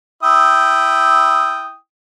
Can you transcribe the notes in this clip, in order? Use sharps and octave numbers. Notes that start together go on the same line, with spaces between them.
E4 G5 D#6